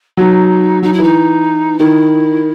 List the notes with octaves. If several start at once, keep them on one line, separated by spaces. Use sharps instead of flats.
F#3 D#4
F#3 D#4
E4
E3 D#4
D#3 E4